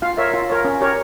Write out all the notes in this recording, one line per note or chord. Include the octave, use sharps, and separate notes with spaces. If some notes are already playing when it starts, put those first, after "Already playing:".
F4 F5
A#4 C#5 E5
F4
A#4 C#5
C#4
G4 A#4 C#5